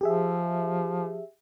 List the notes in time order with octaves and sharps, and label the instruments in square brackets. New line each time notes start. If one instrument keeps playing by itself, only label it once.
[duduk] F3 [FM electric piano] G4 G#4 E5